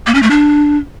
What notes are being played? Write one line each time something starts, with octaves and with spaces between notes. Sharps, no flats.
A#3
C#4
A3
D4